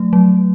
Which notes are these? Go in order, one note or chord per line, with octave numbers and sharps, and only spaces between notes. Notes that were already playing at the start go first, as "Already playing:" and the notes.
Already playing: F#3 A3
F#3